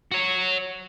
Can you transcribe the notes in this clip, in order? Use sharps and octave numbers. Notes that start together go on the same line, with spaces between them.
F#4 C#5